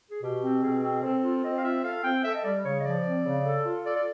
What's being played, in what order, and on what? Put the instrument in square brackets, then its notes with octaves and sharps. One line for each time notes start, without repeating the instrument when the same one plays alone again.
[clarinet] G#4
[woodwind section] B2 [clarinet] G4
[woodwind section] C4
[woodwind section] B2 [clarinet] G#4
[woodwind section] C4
[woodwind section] C4 [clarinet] A4
[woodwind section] F4
[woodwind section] C4 [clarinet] D#5
[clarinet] F5
[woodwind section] F4 [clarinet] E5
[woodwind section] A4 [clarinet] F5
[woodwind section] C4 [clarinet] G5
[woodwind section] A4 [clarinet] E5
[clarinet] D#5
[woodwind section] G3 [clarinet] D5
[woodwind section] C#3 [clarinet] C#5
[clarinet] D#5
[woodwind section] F3 [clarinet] D5
[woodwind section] C4
C#3
A4
F4
[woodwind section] A4 [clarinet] D5
[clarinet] D5